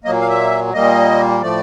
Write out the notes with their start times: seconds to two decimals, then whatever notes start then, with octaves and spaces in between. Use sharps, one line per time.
0.04 A#2 F#3 A#3 D#5
0.21 F5
0.30 E5
0.73 A#2 G3 A#3 D#5
1.41 A2 F3 A3 D5